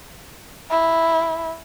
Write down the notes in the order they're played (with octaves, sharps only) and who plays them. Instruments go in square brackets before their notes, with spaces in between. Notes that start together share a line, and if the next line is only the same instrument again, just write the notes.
[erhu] E4